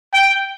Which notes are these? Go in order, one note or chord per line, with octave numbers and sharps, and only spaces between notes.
G5